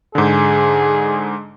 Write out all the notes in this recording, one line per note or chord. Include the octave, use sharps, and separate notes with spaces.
G#2 D3 G#4